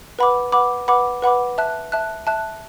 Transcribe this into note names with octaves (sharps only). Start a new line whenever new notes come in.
B4 F#5 B5 D6
B4 F#5 B5 D6
B4 F#5 B5 D6
B4 F#5 B5 D6
E5 A5 F#6
E5 A5 F#6
E5 A5 F#6